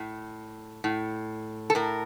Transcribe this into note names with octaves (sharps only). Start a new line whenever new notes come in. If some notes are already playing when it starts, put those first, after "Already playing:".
Already playing: A2
A2
A4
A2 A#4